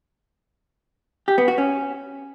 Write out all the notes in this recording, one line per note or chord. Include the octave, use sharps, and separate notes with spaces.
G4
B3
F#4
C#4